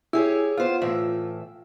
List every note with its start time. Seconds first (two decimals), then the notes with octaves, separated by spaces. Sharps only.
0.13 E4 G4 G#4 C#5
0.57 B3 F4 C5
0.81 A2 E3 E5